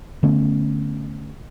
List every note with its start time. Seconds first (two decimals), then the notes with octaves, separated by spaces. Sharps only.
0.23 D3 A3 B3 C#4